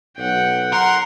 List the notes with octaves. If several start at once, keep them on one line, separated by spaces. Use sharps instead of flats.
B1 F#5 G5
A#4 F#5 C6